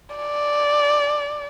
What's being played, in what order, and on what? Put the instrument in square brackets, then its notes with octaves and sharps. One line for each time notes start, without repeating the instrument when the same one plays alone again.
[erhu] D5